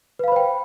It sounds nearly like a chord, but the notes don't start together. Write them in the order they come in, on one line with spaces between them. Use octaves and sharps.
B4 F5 B5 C5 G5